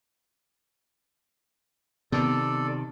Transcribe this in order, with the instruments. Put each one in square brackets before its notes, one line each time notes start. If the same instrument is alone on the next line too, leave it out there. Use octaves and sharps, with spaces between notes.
[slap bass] C3 D#3 [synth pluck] B3 [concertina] A4 D5